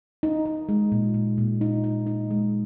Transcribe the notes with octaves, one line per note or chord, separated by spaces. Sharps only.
D#4
D#4
G#3
A#2
A#2
A#2
D#4
D#4
D#4
G#3